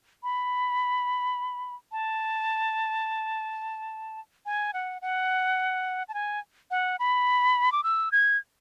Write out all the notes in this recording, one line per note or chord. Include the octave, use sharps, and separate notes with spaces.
B5
A5
G#5
F#5
F#5
A5
G#5
F#5
B5
D6
E6
G#6